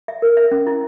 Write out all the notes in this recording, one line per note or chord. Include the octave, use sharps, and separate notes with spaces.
E5
A#4
E5
C#4
E4